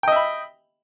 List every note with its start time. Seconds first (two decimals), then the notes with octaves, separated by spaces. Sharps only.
0.03 G5
0.08 D#5
0.12 E5
0.16 B5